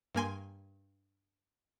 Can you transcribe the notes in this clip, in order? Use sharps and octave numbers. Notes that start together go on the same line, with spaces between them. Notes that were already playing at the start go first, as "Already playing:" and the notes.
G2 A#3 G#5 C6